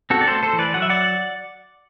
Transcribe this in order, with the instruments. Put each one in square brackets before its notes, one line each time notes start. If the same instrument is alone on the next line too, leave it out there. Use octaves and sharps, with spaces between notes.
[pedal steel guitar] C4 F#4 A4
D5
A3 A4 C5
A4 C5
E3
B4 D5
F#3 F#5
E5
D5 F#5